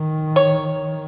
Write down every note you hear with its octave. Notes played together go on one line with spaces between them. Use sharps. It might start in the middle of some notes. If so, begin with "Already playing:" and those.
Already playing: D#3
C#5